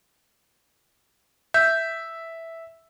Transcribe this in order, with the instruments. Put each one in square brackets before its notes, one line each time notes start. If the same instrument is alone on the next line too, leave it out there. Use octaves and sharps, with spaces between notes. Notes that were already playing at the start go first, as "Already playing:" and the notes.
[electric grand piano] E5 [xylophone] G6